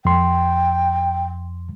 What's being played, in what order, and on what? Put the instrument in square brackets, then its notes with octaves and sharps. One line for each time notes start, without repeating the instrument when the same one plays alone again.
[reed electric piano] F2 C6 [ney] G5